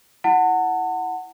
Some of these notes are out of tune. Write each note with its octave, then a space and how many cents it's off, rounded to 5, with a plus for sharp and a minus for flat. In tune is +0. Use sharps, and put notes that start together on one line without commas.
E4 +0 F#5 +0 A5 +40